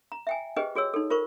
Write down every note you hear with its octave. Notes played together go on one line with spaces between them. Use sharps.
A#5
E5 G5 G#5
G4 G#4 B4 C5 D#5 G5
F#4 G#4 C#5 E6
D#4 A4
F4 A#4 C5 C#6